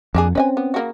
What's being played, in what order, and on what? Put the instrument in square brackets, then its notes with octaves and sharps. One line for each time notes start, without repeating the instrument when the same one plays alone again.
[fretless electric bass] F2 [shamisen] A#3 D4 G#4
[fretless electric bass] C4 C#4 [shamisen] B4 D#5 G#5
[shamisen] B3
C#3 A#3 F#4